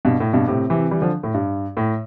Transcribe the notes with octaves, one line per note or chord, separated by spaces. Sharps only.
G2 B2
A2
G2 B2
A2 C3
C3 E3
E3 G3
D3 F3
A2
G2
A2